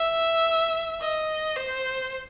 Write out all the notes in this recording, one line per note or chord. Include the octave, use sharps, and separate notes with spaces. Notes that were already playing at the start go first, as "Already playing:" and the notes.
Already playing: E5
D#5
C5